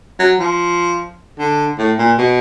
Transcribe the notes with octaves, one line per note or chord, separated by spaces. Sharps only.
F#3
F3
D3
A2
A#2
B2